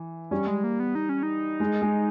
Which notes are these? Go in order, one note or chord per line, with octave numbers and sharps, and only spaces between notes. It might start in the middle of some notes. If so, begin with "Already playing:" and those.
Already playing: E3
G3 C#4
G#3
A#3
B3
D#4
C#4
D#4
G#3
G#3